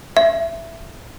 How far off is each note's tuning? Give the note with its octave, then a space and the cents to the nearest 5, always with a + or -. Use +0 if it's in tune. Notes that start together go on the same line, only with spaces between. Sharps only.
E5 +15